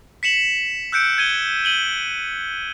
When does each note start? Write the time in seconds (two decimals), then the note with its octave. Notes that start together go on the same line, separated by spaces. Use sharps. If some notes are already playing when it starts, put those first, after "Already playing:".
0.23 B6 C#7 E7 F#7
0.92 E6 F#6 G6 C#7 D7
1.18 G#6 D#7 G7
1.65 D#7 F#7 G7